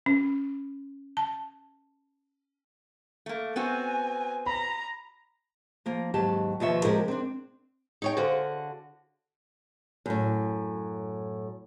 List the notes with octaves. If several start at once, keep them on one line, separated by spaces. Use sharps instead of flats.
C#4
A5
A3 A#3
B3 C4 F#4 G#5
A#5 B5
F3 A#3
D#2 G#2 F#3 G4 A5
D#2 B2 F3 F4 C#5 E5
C3 F3 G#3 G4 A#4
C4 D4
D#4 C#5 G5
D3 F#4 G#4 C5 F5
F#2 A2